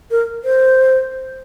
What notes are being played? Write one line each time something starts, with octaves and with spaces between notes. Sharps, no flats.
A#4
C5